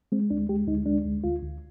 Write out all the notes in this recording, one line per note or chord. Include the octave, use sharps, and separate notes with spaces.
G#3 C4
D2 D4
G#3 G4
D2 D#4
G#3 D4
D2
D2 F4
D2